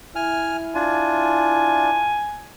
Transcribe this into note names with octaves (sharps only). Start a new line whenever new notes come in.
E4 G#5 F6
D4 F4 G#5